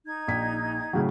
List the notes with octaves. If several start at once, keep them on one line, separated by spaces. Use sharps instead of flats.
D#4 G#6
A#1 B6
A2 C#3 F#3